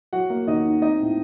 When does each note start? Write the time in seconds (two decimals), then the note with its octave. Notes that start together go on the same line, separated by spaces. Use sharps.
0.13 F#3 F#4 F#5
0.30 A#3
0.47 D#2 D#4 D#5
0.65 D#3
0.82 C4 D#4 D#5
1.00 A2